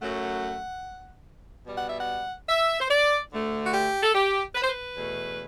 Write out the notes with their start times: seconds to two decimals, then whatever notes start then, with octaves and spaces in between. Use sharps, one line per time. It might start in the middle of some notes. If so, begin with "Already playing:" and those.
0.02 F#2 F#3 A3 F#5
1.66 B2 G3
1.78 F#5
1.90 E5
2.00 F#5
2.49 E5
2.81 C5
2.90 D5
3.32 D2 D3 A3
3.66 F#4
3.73 G4
4.03 A4
4.14 G4
4.55 B4
4.63 C5
4.70 B4
4.96 E2 B2 A3